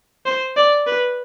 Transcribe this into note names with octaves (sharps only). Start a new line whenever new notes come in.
C5
D5
B4